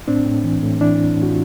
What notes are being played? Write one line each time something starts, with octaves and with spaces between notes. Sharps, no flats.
A2 C4 D4
A2
E3
A2
E3 D4 E4
A2
A2
F#4
F4